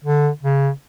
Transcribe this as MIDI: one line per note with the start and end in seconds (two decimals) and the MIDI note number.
0.04 0.29 50
0.43 0.70 49